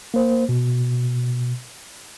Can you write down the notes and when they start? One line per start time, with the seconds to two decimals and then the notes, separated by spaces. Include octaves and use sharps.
0.14 A#3 C5
0.49 B2